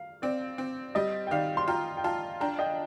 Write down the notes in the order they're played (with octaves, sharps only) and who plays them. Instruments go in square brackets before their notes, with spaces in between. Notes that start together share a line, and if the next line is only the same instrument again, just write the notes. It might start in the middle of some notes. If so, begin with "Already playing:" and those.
Already playing: [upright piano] F5
[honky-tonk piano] C4 [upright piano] D5
[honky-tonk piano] C4
[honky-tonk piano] G3 [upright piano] D#5
[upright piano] G5
[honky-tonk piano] D#3 [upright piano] D5 F5
[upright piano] C6
[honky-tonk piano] F4 [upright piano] G5 A#5
[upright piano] G5
[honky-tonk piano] F4 [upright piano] F5 A5
[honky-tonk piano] D4 [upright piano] G5 A#5
[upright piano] D#5 G5